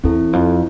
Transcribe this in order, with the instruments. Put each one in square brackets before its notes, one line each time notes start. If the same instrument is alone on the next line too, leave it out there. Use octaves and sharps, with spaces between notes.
[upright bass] E2 [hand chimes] C4 E4 A4
[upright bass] F2